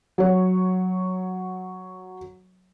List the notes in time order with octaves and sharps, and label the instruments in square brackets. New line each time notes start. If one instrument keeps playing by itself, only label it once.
[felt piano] F#3 C#5